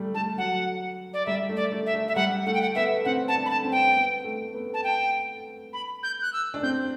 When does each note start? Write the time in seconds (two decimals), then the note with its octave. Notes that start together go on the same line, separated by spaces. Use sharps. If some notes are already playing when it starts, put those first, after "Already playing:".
Already playing: G3 A3
0.15 A3 A5
0.37 F#3 F#5
1.14 D5
1.26 G3 E5
1.49 A3
1.56 D5
1.72 A3
1.86 E5
1.94 A3
2.08 E5
2.16 G3 F#5
2.46 A3 F#5
2.54 G5
2.62 F#5
2.75 B3 E5
3.05 C4 F#5
3.28 A5
3.35 D4
3.46 B5
3.50 A5
3.65 C4
3.72 G5
3.95 B3
4.24 A3
4.54 B3
4.74 A5
4.84 G5
5.73 B5
6.03 G6
6.22 F#6
6.33 E6
6.54 D4
6.63 C4 G6